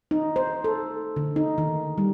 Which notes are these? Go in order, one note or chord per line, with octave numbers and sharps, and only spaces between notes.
D#4
C5
A4
D3
D#4
D#3
G3